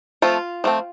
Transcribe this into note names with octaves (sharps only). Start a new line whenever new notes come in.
F3 A3 C4 F4
F3 A3 C4